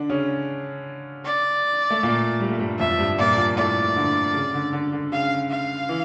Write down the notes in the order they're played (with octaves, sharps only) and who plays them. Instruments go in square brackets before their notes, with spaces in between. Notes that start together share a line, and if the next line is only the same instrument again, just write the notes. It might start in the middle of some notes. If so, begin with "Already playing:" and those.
Already playing: [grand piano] D3 D4
C#3 C#4
[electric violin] D5
[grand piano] A3
A#2 A#3
G3
A3
G2 G3
[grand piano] F2 F3 [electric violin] E5
[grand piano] F3
G2 G3
[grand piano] A#2 A#3 [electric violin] D5
[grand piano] A#2 A#3
[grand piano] A2 A3 [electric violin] D5
[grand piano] D3
C#3
D3
D3
D3
[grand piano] C#3 [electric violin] F5
[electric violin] F5
[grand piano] E3